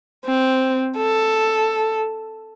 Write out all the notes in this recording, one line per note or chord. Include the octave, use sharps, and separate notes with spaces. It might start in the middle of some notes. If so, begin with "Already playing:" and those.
C4
A4